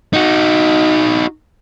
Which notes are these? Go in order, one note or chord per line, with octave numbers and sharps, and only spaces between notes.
D#4 F#4